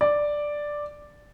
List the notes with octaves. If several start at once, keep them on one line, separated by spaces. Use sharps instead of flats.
D5